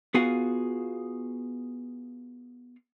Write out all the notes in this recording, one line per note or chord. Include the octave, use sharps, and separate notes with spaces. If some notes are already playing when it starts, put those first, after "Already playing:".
B3 F4 F#4 G#4 F5 F#5